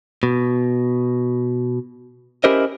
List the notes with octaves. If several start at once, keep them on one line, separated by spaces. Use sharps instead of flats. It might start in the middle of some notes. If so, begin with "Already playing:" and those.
B2
C#4 E4 G4 A#4 C5 D#5